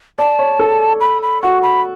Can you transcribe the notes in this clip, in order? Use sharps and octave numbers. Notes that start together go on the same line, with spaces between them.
D5 A5
C#5
A4
B5
B5
F#4 C#6
B5